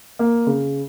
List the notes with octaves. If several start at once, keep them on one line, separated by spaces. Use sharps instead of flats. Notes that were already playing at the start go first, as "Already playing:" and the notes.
A#3
C#3